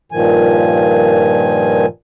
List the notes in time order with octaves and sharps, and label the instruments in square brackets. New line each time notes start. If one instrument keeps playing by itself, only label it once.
[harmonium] G2 A#2 D#3 F3 G#5